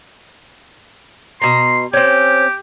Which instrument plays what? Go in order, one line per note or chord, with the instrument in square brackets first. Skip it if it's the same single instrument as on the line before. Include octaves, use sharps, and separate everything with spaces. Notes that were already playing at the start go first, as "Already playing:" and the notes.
[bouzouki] B2 A#5 [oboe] C6
[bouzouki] C4 C#4 [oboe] G4